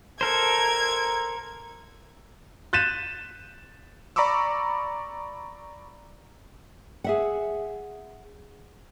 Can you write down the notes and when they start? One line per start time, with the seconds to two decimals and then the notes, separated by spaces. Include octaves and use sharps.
0.21 A4 A#4 C5 G#6
2.73 F#6 G6 A6 B6 D#7 E7
4.16 D5 A#5 B5 C#6 D6 E6
7.04 G#4 E5 F#5